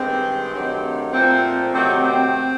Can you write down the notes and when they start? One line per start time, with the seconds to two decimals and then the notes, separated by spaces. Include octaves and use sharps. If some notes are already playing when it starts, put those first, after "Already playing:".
Already playing: G2 D#3 G#3 C4
0.53 G2 D#3 F#3 A3
1.12 A#2 F3 A3 C4
1.72 C3 D#3 F#3 A3 C4
2.03 C4